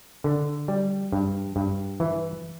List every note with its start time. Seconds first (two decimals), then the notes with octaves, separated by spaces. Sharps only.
0.24 D3
0.68 G3
1.12 G2
1.56 G2
2.00 E3